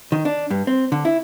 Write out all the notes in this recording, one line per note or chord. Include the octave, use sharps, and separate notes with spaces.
D#3
D4
G2
C4
D3
E4